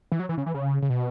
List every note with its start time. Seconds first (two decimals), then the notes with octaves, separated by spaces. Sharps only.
0.12 E3
0.19 F#3
0.29 E3
0.37 C#3
0.46 E3
0.54 C#3
0.82 C#3
0.90 B2